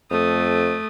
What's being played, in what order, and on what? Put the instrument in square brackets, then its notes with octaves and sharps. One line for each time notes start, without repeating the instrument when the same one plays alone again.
[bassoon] F2 [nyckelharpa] A3 D#6